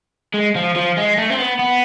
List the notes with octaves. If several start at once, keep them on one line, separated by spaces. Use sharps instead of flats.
G#3
F3
F3
G#3
A3
C4
B3
B3